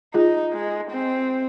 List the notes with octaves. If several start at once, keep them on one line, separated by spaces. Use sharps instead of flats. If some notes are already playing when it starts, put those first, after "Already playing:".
D#4 F4 G#4
G#3
C4